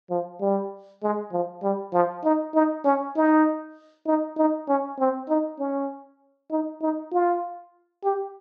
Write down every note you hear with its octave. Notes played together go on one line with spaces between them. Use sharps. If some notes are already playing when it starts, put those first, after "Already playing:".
F3
G3
G#3
F3
G3
F3
D#4
D#4
C#4
D#4
D#4
D#4
C#4
C4
D#4
C#4
D#4
D#4
F4
G4